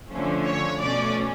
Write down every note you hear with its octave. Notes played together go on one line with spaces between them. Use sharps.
D3 F3 A3 C#4
C#5
B2 A3 C#4 D5